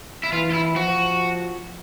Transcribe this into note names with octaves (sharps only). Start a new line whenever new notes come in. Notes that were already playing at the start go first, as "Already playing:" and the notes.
E4
E3 F4
F4
E4
F3 F#4